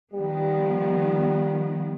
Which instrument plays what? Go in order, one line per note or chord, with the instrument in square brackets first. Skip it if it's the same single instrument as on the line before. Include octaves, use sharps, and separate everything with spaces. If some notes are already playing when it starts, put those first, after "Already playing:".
[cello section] D#3 F3 B3 [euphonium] G3